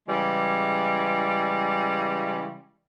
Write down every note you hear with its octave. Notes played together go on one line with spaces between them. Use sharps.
C#3 E3 G3 G#3